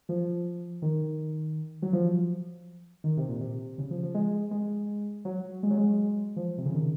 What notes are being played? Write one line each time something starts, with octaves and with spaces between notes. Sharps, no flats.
F3
D#3
F#3
F3
D#3
C3
A#2
C3
C#3
F3
F3
G#3
G#3
F#3
G#3
F#3
G#3
F3
C3
C#3
D#3